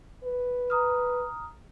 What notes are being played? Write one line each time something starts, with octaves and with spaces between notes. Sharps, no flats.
B4
A#5 D#6 F6